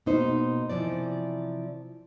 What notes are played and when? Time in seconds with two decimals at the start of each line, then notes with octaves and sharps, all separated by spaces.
0.06 B2 A#3 D#4 C5
0.70 C3 E3 F3 D5